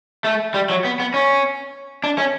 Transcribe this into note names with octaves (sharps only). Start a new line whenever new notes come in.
A3
G3
F#3
B3
B3
C#4
D4
C#4